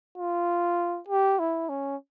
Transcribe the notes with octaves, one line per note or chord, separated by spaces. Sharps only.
F4
G4
E4
C#4